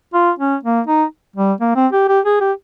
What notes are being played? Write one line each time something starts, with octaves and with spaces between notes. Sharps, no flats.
F4
C#4
A#3
D#4
G3
A#3
C4
G4
G4
G#4
G4